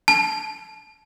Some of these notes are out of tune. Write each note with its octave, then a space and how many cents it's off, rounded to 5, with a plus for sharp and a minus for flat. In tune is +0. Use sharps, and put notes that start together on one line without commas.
A5 -20